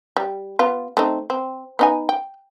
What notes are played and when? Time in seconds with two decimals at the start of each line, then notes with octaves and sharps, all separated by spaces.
0.17 G3
0.59 B3 F4
0.97 A3 C4 D#4
1.30 C4
1.79 B3 D#4 G#5
2.09 G5